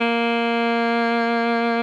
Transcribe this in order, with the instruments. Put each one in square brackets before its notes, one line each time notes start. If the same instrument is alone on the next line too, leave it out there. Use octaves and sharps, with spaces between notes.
[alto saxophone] A#3